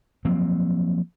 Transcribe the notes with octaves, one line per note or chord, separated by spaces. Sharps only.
F3 F#3 A#3 C4